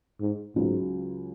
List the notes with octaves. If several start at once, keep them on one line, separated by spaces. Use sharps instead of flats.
G#2
C#2 G#2 C#3 F#3